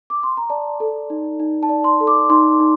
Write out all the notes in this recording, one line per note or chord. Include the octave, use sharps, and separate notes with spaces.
D6
C6
A#5
D5 A5
A4
D#4
D#4
A5
D5
C6
A4
D6
D#4 C6
D#4